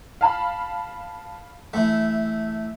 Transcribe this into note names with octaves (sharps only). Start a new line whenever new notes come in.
F5 A5 B5
E3 A3 E5